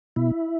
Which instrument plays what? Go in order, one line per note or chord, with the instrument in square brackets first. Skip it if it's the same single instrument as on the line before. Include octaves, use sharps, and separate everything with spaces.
[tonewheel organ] B2 E4